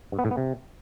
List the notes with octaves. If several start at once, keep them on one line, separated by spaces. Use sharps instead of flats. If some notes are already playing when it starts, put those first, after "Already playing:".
G2
B3
A2
B3
C3